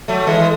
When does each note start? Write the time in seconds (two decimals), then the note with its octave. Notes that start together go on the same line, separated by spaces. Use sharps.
0.08 F#3 A3
0.27 E3 G#3